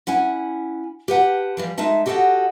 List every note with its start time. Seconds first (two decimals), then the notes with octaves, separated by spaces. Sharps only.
0.07 C#4 E4 F#5 G#5
1.08 G4 B4 F#5 A5
1.57 E3 F3 G3
1.78 G#3 A3 D#4 E5 A5
2.06 F#4 G4 A4 B4 D#5 F#5